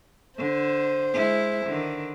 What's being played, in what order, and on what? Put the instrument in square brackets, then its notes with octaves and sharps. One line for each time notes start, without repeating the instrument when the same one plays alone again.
[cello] D3 [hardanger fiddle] C5
[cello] G#3 E4
D3 D#3